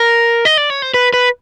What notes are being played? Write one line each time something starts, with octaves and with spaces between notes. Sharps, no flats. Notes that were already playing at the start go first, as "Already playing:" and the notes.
Already playing: A#4
D#5
D5
C#5
C5
B4
B4